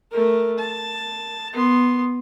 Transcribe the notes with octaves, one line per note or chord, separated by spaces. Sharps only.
A3 A#4
A5
B3 C6